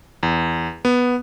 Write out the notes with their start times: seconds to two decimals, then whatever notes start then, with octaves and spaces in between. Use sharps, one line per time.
0.23 E2
0.85 B3